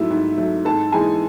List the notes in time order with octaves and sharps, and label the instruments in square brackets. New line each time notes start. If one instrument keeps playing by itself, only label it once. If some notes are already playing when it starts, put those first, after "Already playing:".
Already playing: [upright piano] G#2 F#3 A3 E4 E5
G#2
F#3 A3
G#2 A4 A5
E3 G#3 G#4 G#5